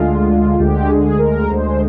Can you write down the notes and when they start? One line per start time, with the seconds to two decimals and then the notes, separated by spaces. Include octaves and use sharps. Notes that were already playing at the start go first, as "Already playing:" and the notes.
Already playing: D2 D3 G#3 F4
0.59 D2 D3 G#3 G4
0.89 G#4
1.19 A#4
1.49 D2 D3 G#3 C5